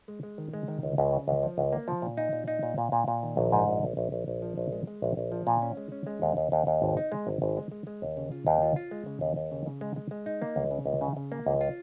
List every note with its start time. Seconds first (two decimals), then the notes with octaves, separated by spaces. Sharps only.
0.08 G#3
0.23 G#3
0.38 D#3
0.53 G#3
0.68 D#3
0.83 C#2
0.98 C#2
1.13 C#3
1.28 C#2
1.43 F3
1.58 C#2
1.73 A#3
1.88 F3
2.02 A#2
2.17 D#4
2.33 A#2
2.48 D#4
2.63 A#2
2.78 A#2
2.92 A#2
3.08 A#2
3.23 D#3
3.37 A#1
3.52 G#2
3.68 A#1
3.83 A#1
3.97 A#1
4.12 A#1
4.28 A#1
4.42 F3
4.57 A#1
4.73 G#3
4.87 G#3
5.02 A#1
5.17 A#1
5.32 F3
5.47 A#2
5.62 C#4
5.77 G#3
5.92 C#4
6.07 G#3
6.22 D#2
6.37 D#2
6.52 D#2
6.67 D#2
6.82 G#1
6.97 D#4
7.12 G#3
7.27 G#1
7.42 G#1
7.57 G#3
7.72 G#3
7.87 G#3
8.02 D#2
8.17 C#3
8.32 F4
8.47 D#2
8.62 F4
8.76 F4
8.91 G#3
9.06 C#3
9.21 D#2
9.36 D#2
9.51 C#3
9.66 C#3
9.81 G#3
9.96 G#3
10.11 G#3
10.26 D#4
10.42 A#3
10.56 C#2
10.71 C#3
10.86 C#2
11.01 C#3
11.17 C#3
11.32 A#3
11.46 C#2
11.61 F4